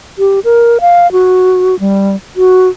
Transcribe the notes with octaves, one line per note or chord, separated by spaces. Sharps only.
G4
A#4
F5
F#4
G3
F#4